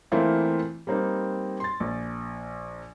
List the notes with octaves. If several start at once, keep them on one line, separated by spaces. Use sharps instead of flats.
E3 A3 A#3 C4 E4 F4
G3 A#3 C4 D#4
C6 A6
A#1